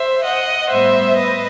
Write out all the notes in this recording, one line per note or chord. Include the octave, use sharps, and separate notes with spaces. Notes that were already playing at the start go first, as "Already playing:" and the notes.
Already playing: C5 E5
D#5 F#5
A2 G3 B3 C5 E5
B4 D#5